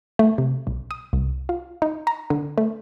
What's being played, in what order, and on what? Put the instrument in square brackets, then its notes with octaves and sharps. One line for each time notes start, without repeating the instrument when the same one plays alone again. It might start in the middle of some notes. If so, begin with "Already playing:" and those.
[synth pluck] A3
C3
B1
D#6
C2
F4
D#4
A#5
D3
A3